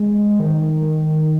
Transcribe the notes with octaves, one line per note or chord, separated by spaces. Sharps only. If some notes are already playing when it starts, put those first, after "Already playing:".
Already playing: G#3
D#3